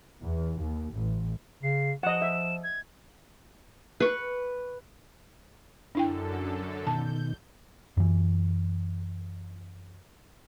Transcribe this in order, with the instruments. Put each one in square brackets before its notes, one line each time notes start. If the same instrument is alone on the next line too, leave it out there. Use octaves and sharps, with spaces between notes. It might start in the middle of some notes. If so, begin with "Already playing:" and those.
[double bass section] E2
D#2
A1
[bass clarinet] C#3 [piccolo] C7
[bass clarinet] F3 [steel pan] D#5 F#5 [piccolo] E7
[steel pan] E5
[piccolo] G#6
[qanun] B4 C#6
[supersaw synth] F#2 D3 A4 [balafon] D4 E4 G5
[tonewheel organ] B2 D#3 [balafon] A5 [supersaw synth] G6
[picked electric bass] F#2 E3